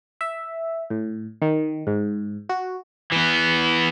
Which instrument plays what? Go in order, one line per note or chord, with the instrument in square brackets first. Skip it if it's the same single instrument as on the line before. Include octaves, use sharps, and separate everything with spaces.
[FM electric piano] E5
A2
D#3
G#2
F#4
[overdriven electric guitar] E3 B3